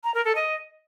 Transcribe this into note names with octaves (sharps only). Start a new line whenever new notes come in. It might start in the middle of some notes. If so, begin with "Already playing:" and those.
A#5
A#4
A4
D#5